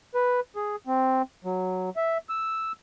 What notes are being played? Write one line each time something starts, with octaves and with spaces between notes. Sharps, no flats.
B4
G#4
C4
F#3
E5
E6